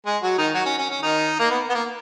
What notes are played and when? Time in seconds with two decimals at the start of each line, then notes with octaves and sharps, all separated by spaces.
0.06 G#3 G#4
0.23 F#3 F#4
0.37 D#3 D#4
0.54 F#3 F#4
0.66 C#4
0.78 C#4
0.90 C#4
1.02 D#3 D#4
1.39 A#3
1.50 B3
1.69 B3
1.74 A#3